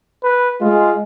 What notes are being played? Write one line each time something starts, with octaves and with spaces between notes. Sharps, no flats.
B4
G#3 F4